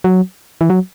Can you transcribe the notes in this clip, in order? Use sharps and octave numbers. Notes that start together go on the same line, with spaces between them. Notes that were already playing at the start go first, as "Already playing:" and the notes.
F#3
E3
F#3